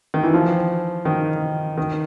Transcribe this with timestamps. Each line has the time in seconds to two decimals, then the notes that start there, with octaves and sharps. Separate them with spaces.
0.14 D#3
0.23 E3
0.34 F3
1.05 D#3
1.77 D#3